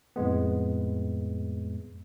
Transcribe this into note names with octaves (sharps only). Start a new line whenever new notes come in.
F2 A2 G#3 B3